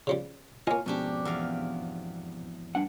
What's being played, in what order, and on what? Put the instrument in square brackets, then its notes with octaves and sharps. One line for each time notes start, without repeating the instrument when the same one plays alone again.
[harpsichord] C#3 F3 G3
[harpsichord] A#3 D#5 [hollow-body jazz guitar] F4 C#5 G#5
[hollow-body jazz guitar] F2 G#2 B2 [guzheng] C#4 D4 G4
[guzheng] E2 F5
[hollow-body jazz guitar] G2 D4 F#5